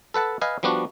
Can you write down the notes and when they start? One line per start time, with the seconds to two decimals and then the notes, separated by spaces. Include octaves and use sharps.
0.14 A4 B4 F#5 A5
0.41 B4 D#5 F5 G#5
0.63 F3 G3 B3 D4 F#4